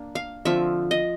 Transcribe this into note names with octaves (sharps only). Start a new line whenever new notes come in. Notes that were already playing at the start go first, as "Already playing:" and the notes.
Already playing: A#3 D4
F5
D3 F3 A3 C4 E5
D#5